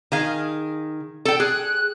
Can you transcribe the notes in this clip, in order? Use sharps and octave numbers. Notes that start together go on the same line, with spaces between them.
D#3 G#4 F5
A4 G5
G#4 F#6